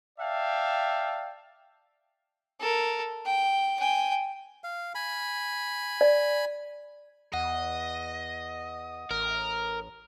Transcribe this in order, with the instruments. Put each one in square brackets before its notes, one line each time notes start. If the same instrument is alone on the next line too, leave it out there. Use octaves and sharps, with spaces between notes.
[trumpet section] D5 E5 F5 G5 A5
[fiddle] A4 A#4
G5
G5 G#5
[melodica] F5
G#5 B5
[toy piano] D5
[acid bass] E2 [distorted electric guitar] D#5 [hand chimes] F#5
[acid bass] A1 [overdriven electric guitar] A#4